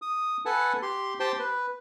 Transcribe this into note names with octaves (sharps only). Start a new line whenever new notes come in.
D#6
A4 B4 F#5 G#5 A5
G4 C6
G4 C5 G5 A5 C6
B4